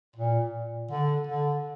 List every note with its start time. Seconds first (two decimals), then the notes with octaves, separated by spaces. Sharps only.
0.16 A#2
0.91 D3
1.27 D3